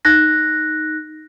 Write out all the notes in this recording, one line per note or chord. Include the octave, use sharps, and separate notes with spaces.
D#4 F#6 A#6